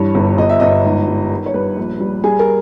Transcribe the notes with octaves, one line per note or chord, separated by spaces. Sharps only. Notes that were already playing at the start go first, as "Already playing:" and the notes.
Already playing: G2 E3 C#5
G1
G1 D#5
E5
G1 D#5
G#2
G3
D#3
C#5
G2 B4
A#1
G3
G3 G#4
A#4